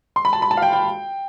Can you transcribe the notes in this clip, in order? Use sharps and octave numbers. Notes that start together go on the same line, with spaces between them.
C6
B5
A5
B5
A5
F5
G5
G5